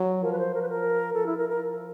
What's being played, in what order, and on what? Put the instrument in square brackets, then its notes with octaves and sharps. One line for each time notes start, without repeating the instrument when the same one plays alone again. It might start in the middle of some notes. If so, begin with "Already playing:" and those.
Already playing: [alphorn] F#3
[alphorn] F3 [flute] A#4
[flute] B4
C5
A#4
B4
A#4
[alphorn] F3 [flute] A4
[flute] E4
A#4
A#4